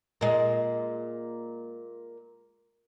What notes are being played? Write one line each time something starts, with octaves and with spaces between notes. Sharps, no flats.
A#2 G#3